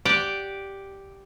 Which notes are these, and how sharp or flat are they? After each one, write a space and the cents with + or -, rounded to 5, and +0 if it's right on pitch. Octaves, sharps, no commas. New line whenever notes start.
G4 +0 D5 +0 F#5 -5